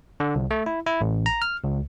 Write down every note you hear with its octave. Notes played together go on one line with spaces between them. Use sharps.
D3
C2
A3
E4
E4
A1
A#5
F6
C#2